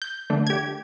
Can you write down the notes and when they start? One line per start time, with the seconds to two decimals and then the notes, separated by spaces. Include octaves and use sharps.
0.02 G6
0.30 D3 A3
0.47 G4 G#6